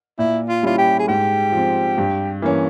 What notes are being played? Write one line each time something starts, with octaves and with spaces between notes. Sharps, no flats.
A#2 E4
F4
G3 C#4 E4 F4
G4
G#4
G#2 G4
F3 C4
G2
E3 A#3 C#4